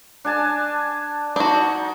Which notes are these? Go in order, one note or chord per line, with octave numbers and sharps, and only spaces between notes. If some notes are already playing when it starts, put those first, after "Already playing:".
D4 G#5 A5
D4 D#4 F#4